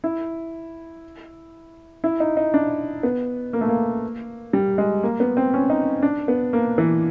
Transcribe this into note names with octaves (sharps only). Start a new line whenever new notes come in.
E4
E4
D#4
D#4
D4
B3
A#3
A3
A#3
G3
G#3
A#3
B3
C4
C#4
D#4
D4
B3
A#3
E3